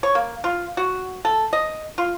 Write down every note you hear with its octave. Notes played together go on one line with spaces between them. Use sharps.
C#5
A#3
F4
F#4
A4
D#5
F4